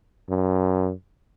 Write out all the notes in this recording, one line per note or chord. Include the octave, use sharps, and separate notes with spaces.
F#2